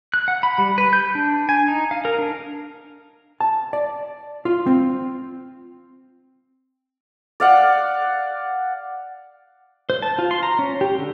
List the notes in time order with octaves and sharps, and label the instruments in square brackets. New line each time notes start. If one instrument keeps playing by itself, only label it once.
[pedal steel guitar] F#6
F#5
B5
G3
B4
G6
D4
G#5
D#4
F5
A#4
D4
[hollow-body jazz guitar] A5
D5
F4
C4
[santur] D5 F5 F#5
[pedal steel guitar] C5
A5
F4
C6
A#5
C#4
G4
D3